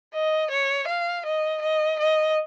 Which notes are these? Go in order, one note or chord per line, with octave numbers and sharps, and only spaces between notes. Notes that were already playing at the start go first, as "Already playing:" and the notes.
D#5
C#5
F5
D#5
D#5
D#5